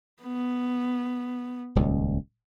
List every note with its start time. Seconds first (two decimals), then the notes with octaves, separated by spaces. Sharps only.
0.23 B3
1.75 D#1 C#2